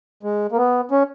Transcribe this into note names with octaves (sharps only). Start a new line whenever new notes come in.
G#3
A#3
B3
C#4